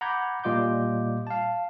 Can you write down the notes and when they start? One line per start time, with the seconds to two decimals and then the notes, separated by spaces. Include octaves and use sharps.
0.01 F#5 A#5 B5 D6 G6 G#6
0.44 A#2 G3 F4 D#5 D6 G6
1.27 F5 A5